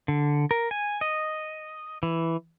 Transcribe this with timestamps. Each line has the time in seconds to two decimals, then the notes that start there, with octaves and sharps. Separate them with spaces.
0.08 D3
0.51 A#4
0.71 G#5
1.01 D#5
2.03 E3